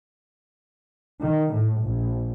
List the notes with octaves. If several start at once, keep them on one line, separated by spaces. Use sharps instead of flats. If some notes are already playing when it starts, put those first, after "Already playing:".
D#3
A2
A#1